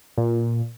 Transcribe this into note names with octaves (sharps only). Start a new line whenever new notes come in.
A#2